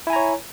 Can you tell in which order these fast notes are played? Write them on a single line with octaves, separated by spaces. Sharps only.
E4 G#5 A#5 C#5